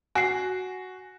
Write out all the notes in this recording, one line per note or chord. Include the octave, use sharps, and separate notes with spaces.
F#4 G#5 C7